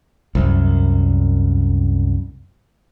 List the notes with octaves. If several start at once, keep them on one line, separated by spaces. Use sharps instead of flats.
C2 F#2